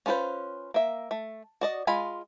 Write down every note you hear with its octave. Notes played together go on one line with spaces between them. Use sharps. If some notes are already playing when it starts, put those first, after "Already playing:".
C#4 D4 F4 B4 C5
A#3 E5
A3
F#4 D5 D#5
G#3 F4 G#5 B5